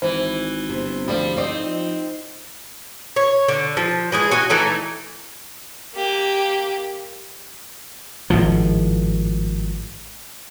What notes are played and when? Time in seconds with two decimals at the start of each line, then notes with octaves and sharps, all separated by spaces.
0.02 G#1 E3 C5
0.69 G1 C3
1.08 D2 F3 G3 A3 D4
1.37 C4 D#4 D5
1.65 F3
3.16 C#5
3.48 D3
3.77 F3
4.12 E3 G#3 G#4
4.31 F#4 D#5 G#5
4.50 E3 A3 D#4 A4
5.95 A#3 G4
8.30 G#1 A2 F3